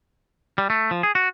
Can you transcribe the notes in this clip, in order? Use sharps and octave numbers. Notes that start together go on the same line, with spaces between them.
G3
A3
F3
G#4
F#4